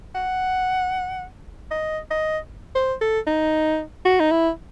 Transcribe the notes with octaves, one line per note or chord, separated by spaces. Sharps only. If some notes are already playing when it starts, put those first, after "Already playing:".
F#5
D#5
D#5
C5
A4
D#4
F#4
D#4
E4